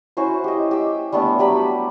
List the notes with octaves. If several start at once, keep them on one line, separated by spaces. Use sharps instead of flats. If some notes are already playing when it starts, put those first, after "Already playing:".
C#4 E4 F#4 C5
G4 D#5
G4 E6
G3 A3 B3 D4
F#3 G3 G4 B5